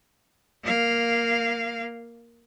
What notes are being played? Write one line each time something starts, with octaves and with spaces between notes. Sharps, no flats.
A#3 F5